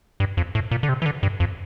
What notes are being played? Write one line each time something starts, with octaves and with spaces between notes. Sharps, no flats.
G2
F2
A2
A#2
D3
C3
E3
D3
G2
F2